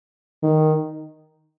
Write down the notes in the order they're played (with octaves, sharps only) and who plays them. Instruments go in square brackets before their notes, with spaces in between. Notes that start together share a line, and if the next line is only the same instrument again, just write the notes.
[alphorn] D#3